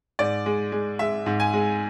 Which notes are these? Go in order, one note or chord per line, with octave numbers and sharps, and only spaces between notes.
G#2 D5
G#3
G#3
G#3 E5
G#2
G#5
G#3